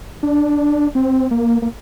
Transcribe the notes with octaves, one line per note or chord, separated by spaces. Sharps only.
D4
C4
A#3
A#3